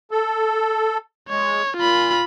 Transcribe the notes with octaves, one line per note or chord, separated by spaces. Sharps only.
A4
G#3 C#5
A#2 F4 B5